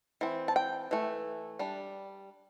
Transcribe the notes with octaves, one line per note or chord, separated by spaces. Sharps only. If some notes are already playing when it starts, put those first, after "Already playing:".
E3 C4
A5
G5
E3 A3
G3 D4